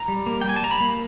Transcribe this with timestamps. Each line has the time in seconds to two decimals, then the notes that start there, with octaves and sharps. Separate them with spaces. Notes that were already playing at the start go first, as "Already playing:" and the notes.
Already playing: A#5
0.08 G3
0.26 A#3
0.41 G5
0.44 G3 G#5
0.56 A5
0.63 G3 A#5
0.71 B5
0.81 A#3